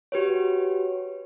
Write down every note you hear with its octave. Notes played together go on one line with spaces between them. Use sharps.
F#4 G4 B4 C#5